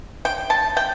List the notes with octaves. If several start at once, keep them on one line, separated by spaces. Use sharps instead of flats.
G5
A5
G5